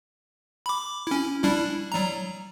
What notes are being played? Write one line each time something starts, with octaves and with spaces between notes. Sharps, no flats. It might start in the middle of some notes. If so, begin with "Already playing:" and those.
B5 D6
C#4 E4
G3 D4 E4
F#3 G3 A#5